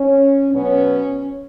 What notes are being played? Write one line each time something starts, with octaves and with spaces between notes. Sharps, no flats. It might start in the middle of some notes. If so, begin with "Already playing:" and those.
Already playing: C#4
B2 F#3 B3 C#4